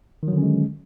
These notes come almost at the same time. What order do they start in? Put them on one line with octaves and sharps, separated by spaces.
D#3 F#3 D3 C#4 G#3